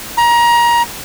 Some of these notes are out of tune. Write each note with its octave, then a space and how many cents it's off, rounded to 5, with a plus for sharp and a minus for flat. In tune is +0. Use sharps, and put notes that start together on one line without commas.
A#5 +25